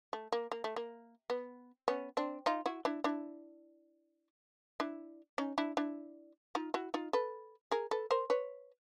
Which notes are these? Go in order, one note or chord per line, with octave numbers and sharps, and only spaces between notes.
A3
A#3
A#3
A3
A#3
B3
B3 C#4
C4 D4
D#4 F4
E4 F#4
D4 E4
D4 E4
D4 E4
C#4 D#4
D4 E4
D4 E4
D#4 F4
E4 F#4
D#4 F4
A4 B4
G#4 A#4
A4 B4
A#4 C5
B4 C#5